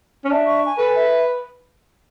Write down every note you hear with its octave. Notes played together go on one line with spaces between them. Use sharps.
C#4
D4 E5
C#6
G#5
A4 B4
E5